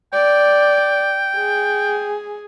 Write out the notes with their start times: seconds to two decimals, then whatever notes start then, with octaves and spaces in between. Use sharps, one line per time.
0.13 D5 G5
1.37 G#4